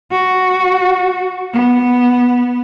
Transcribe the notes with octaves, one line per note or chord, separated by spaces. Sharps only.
F#4
B3